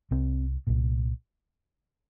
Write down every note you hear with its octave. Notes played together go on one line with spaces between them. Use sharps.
C2 C3 C4
C2 A#2